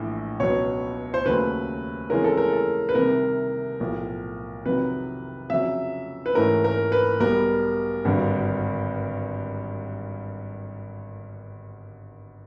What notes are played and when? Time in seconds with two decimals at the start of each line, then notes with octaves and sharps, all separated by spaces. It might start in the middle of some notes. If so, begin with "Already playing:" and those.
Already playing: A#1 A2 E3
0.40 C#2 B2 F#3 C#5
1.14 C5
1.25 D#2 C#3 F#3 A3 B4
2.10 F2 C#3 E3 G#3 C#4 A#4
2.24 A4
2.37 A#4
2.53 A4
2.89 B4
2.95 C2 C3 D#3 A#4
3.80 B1 A2 F3
4.66 F2 C3 D#3 F#3 B4
5.50 F2 C#3 F#3 E5
6.26 B4
6.35 G#2 E3 A3 C#4 A#4
6.64 A#4
6.92 B4
7.20 B1 B2 G3 B3 A#4
8.05 G#1 G2 D3 F#3